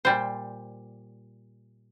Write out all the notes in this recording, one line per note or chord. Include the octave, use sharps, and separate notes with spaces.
A#2 G3 C5